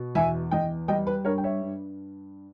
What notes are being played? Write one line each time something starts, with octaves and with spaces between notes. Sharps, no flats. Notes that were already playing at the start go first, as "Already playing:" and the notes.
Already playing: B2
E2 E5 G#5
E2 D#5 G5
G3 D#5 G5
B4
G2 A#4 C#5
G5
C#5 E5
G2